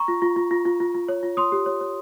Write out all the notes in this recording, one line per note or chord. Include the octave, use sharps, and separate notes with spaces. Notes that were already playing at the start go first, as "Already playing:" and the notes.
Already playing: A#5 C#6
F4
F4
F4
F4
F4
F4
F4
C#5
F4
C#5 C6 D#6
G4
C#5
C#5